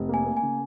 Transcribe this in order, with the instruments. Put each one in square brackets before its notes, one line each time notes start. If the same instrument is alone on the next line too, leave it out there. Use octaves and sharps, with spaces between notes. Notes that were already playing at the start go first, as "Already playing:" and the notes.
Already playing: [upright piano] F1
[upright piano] A#3 [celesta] G#5
[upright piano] A#3
[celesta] G#5
[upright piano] C#3